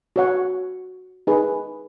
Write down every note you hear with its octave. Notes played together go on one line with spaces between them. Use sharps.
F#4 C#5 F#5
D#4 G#4 B4